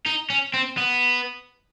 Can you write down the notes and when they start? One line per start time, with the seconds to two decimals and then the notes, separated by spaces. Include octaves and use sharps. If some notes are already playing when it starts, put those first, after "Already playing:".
0.06 D#4
0.30 C#4
0.54 C4
0.77 B3